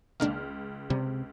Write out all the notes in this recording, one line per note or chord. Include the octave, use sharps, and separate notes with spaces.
C#2 D#3 A#3 D4 F6
C3 G3